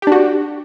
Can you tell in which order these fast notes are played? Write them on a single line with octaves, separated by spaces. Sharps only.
G4 D4 F#4